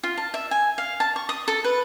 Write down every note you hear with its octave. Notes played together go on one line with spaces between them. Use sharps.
F4
A5
E5
G#5
F5
A5
C#6
D#6
A4
B4